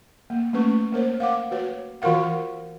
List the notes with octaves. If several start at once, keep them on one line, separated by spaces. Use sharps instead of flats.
A#3
A3 A#3 C#4 B4 C#6
A#3 A#4 C5 C#5
F5 F#5 D6
F#4 B4 C#5
E3 F4 F#4 A#4 F5 F#5